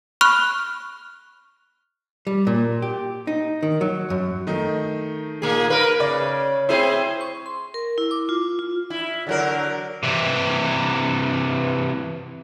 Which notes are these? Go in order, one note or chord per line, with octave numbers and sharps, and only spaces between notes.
B5 C#6 F6 F#6
G3
A#2
G4
D#4
D#3
F#3
F#2
D#3 A3 D#4
A#2 A#3 G#4
A#4 B4
C#3 D5
C4 E4 G#4 C5 B5
C#6
C6
A#4
E4
D6
F4
F4
E4
D3 F#3 A#4
C3 E3